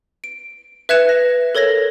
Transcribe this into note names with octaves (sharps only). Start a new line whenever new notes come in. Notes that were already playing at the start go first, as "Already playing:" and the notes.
D7
B4 E5 F#6 G#6 C#7 E7
A#6
A4 A#4 C#5 G#6 A#6